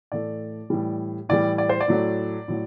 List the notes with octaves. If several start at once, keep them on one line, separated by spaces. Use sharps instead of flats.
A2 E3 A3 D5
A2 E3 G3
A2 E3 G3 D5
D5
C5
D5
A2 F#3 A3
A2 F#3